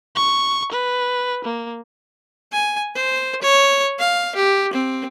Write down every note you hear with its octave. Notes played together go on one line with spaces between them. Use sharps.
C#6
B4
A#3
G#5
C5
C#5
F5
G4
C4